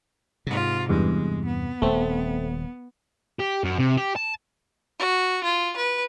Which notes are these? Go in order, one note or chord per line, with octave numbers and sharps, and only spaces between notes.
G#2 C3 F4
E2 G2 G#3
B3
D#1 A3 C4
G4
F#2
C3
G4
A5
F#4
F4
B4